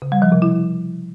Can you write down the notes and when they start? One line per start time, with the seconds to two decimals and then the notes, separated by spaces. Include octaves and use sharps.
0.02 C#3
0.12 G3
0.22 F3
0.32 C3
0.42 E4